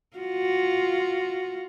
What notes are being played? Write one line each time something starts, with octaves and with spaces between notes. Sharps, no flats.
F4 F#4